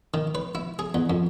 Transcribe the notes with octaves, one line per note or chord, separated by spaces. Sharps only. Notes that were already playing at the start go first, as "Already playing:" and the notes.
D#3
B4
E4
G#4
E2
F2